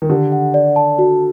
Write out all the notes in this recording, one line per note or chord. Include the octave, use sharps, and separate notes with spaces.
D#3
D3 G4
F#5
D5
A5
F#4